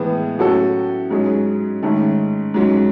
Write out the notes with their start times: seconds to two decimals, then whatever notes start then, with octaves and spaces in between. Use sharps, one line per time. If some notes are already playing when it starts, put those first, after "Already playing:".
Already playing: A2 E3 G#3 B3
0.38 A2 F#3 C#4 F#4 A4
1.10 G#2 F#3 C#4 G#4 C#5
1.83 G#2 D#3 A3 C#4
2.54 G#2 F#3 C#4